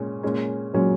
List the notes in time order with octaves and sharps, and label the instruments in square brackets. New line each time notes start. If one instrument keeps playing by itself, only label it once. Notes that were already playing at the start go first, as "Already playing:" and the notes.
Already playing: [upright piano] A#2 G#3 C#4
A#2 G#3 C#4
[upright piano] A#2 G#3 C#4 [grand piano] F#3